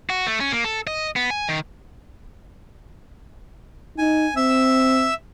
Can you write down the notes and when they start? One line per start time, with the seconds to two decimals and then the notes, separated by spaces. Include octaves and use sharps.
0.10 F#4
0.27 A3
0.40 C#4
0.52 A#3
0.65 A4
0.87 D#5
1.16 B3
1.30 G#5
1.49 D#3
3.98 D#4 G#5
4.36 C4 E5 E6